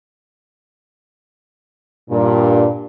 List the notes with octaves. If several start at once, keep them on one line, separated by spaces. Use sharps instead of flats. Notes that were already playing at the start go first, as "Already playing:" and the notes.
G2 A#2